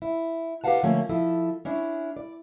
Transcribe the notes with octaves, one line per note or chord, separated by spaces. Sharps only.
E4
G4 B4 D5 F5 F#5 A5
D3 F3 A3 A#3 C#4
F3 E4 A4
C#4 D4 E4
D5